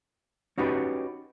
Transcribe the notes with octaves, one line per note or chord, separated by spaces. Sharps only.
C#4 D#4 F#4 G4 B4